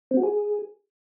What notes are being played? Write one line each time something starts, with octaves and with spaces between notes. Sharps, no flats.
C4
F#4
G#4